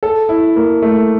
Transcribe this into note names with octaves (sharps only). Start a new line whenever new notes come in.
A4
E4
A#3
A3